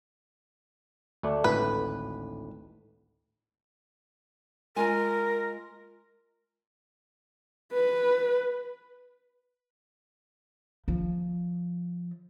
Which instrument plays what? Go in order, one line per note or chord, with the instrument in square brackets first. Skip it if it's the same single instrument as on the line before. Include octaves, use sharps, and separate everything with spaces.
[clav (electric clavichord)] D2 A3 D4
[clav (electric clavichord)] G#1 D2 A2 [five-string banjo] B4
[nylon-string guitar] G#3 F4 G#5 [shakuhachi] A#4
[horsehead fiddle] B4
[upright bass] F3